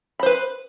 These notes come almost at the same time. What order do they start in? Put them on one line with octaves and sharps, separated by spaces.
B5 C5 B4